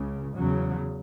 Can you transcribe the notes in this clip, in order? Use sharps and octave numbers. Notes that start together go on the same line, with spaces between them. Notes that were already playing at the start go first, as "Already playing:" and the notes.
Already playing: C#2 C#3
E2 C#3 F#3